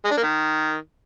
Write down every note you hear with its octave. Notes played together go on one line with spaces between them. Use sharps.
G#3
D4
A#3
D#3